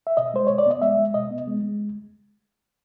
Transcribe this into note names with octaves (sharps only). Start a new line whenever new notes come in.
E5
B2 D#5
G#3 C5
B2 C#5
D5
B3 D#5
G#3 E5
G#3
B2 D#5
B3
G#3
G#3